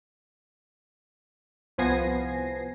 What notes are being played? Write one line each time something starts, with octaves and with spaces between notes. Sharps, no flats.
C2 F3 B3 G#5 A#6 C7